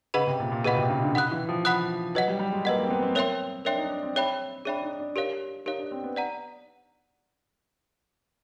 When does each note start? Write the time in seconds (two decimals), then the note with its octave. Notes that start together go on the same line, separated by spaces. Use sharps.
0.14 C#3 G#4 B4 D#5 F#5 B5
0.27 C3
0.40 A#2
0.52 A#2
0.64 B2 G#4 B4 D#5 F#5 B5
0.76 C3
0.90 C#3
1.02 D3
1.14 D#3 F#5 B5 D#6 F#6
1.32 E3
1.49 F3
1.65 F#5 B5 D#6 F#6
2.15 F#3 B4 D#5 F#5
2.28 G3
2.39 G3
2.52 G#3
2.65 A#3 B4 D#5 F#5
2.78 A#3
2.84 C4
2.90 B3
3.02 C4
3.15 A#4 C#5 E5 G5 C6
3.65 D4 A#4 C#5 E5 G5 C6
3.78 D#4
3.90 D4
4.03 C4
4.16 G#4 C#5 E5 G5 B5
4.65 D4 G#4 C#5 E5 G5 B5
4.82 D#4
5.00 D4
5.16 G4 A#4 C#5 F5
5.66 D#4 G4 A#4 C#5 F5
5.78 D4
5.91 C4
6.03 B3
6.16 D5 F#5 A#5